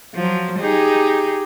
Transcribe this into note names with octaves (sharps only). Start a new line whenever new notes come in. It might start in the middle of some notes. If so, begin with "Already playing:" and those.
F3 F#3
D#4 G4 G#4